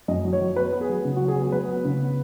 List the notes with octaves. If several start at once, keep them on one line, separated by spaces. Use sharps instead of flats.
F#2 D#5
F#3
C#5
F#3
B3 B4
B3
G#4
F#3
C#3
F#4
F#3
G#4
B3
G#4
F#3 B4
B3
C#3
B3